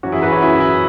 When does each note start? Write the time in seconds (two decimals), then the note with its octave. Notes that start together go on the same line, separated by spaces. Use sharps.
0.03 F#2 E3 C#4 F#4
0.12 E4 G#4
0.22 F#4 B4
0.32 C#4 F#4
0.42 E4
0.60 E4